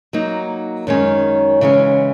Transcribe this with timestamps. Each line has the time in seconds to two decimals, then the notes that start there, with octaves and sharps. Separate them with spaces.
0.13 F#3 A#3 D#4
0.87 F#2 D#3 G#3 C#4
1.61 C#3 E3 G#3 C#4